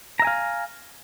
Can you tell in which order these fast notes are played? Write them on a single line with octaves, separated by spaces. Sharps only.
A#5 E5 G#5 F5